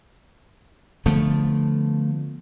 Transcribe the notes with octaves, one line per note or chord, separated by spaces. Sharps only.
D3 F3 A3 B3